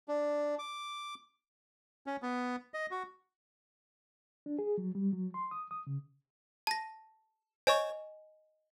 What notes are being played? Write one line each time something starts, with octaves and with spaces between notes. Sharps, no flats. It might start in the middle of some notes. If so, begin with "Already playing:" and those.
D4
D6
C#4
B3
D#5
F#4
D4
G#4
F#3
G3
F#3
C6
D#6
D#6
C#3
A5 A#6
C5 C#5 D#5 G#5 C#6